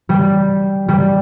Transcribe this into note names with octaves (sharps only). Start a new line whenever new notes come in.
G3
G3